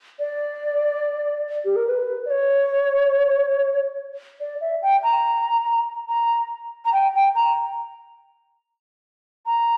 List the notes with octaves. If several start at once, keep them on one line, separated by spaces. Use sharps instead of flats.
D5
G4
A#4
B4
D5
C#5
D5
E5
G5
A#5
A#5
A#5
G5
G5
A#5
A#5